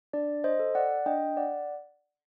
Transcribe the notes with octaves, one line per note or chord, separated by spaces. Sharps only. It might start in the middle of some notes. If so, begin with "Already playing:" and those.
D4 D5
C5 D#5
A4
D5 F#5
D4 D#5 G5
D5 F#5